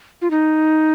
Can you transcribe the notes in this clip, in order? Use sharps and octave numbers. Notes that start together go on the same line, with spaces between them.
F4
D#4